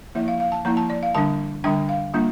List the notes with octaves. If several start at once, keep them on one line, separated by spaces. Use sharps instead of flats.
F3 A#3 E4 E5
F5
F5
A5
F3 A#3 E4 A#5
A5
D5
F5
D3 G3 D4 A5
D3 G3 D4 G5
F5
G3 A#3 D4 F4